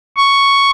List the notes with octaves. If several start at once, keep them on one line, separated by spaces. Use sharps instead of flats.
C#6